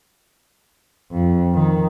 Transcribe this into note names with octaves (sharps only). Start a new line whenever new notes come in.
F2
D#3